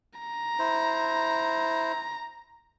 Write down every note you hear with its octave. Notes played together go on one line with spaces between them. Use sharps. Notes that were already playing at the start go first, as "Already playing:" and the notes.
A#5
E4 C5